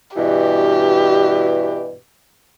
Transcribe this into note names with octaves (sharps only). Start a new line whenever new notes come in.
G2 B2 E3 G4